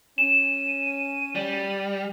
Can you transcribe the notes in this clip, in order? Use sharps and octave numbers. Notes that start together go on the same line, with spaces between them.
C#4 D#7 E7
G3